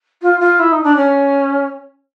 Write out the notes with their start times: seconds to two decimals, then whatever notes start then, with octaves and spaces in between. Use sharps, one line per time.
0.22 F4
0.40 F4
0.59 E4
0.72 D#4
0.84 D4
0.97 C#4